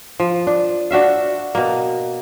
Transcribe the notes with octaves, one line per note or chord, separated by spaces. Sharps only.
F3
D4
D4 F#4 E5 F5
B2 A#3